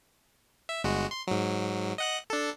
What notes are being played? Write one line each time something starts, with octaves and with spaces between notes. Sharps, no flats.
E5
G1 G#3 F#4
C6
G#2 F#3
D#5 F#5 F#6
D4 A4